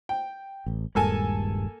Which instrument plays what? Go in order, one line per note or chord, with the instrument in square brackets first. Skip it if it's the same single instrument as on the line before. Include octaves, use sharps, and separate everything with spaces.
[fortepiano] G5
[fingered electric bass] A1
[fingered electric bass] D#1 G2 G#3 [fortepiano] A#3 A4 G#5